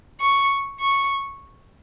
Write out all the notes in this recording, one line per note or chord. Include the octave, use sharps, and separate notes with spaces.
C#6
C#6